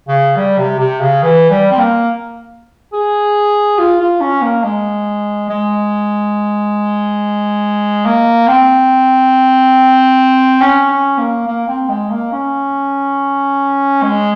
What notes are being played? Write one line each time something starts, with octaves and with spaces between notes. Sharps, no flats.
C#3
G3
C3
C3
C#3
E3
G3
C4
A#3
G#4
F4
F4
C#4
A#3
G#3
G#3
A#3
C4
C#4
C#4
A#3
A#3
C4
G#3
A#3
C#4
G#3